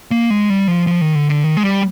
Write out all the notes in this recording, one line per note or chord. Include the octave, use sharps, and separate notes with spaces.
A#3
G#3
G3
F3
F3
D#3
D3
D3
D#3
G#3
G3